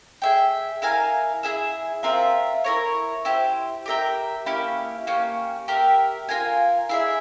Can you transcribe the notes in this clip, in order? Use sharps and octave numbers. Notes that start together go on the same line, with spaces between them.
G#4 E5 G5
E4 A#4 F5 G#5
E4 G#4 E5
C4 F4 A#4 E5
E4 A#4 C#5
E4 G4 C5
G4 A#4 E5 G5
A#3 C#4 E4 G4
A#3 C#4 G4
G4 A#4 E5
F4 A#4 F5 G#5
E4 G#4 E5